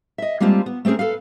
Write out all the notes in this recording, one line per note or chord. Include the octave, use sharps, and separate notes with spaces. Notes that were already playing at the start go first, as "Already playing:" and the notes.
D#5 E5
G3 G#3 A#3 C4 F4 A5
B3
A3 C4 C#4 G#4 A#4
A4 B4 F5